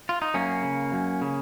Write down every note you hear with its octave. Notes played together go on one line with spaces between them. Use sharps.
F4
D#4
F#2 A#3 C#4
C#3
F#2
C#3